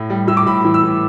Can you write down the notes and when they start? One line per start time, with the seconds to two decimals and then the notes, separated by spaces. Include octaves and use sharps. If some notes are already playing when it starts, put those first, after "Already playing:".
Already playing: A2
0.10 G3
0.27 A2 E6
0.37 D6
0.46 A2 B5
0.64 E3
0.74 E6
0.83 A2